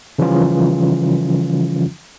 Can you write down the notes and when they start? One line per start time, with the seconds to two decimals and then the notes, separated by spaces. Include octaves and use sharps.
0.19 C#3 E3 F3 G3 C#4 F4